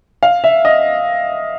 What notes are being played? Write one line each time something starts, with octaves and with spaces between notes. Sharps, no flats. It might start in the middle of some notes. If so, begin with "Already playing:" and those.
F5
E5
D#5